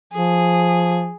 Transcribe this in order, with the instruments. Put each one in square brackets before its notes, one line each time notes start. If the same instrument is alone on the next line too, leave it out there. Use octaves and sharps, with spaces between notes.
[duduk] F3 [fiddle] G#4